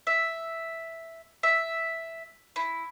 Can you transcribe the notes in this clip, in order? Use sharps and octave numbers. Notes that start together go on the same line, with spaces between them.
E5
E5
E4